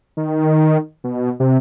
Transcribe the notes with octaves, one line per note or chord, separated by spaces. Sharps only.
D#3
B2
C3